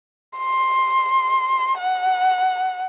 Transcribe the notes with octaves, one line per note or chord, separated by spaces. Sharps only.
C6
F#5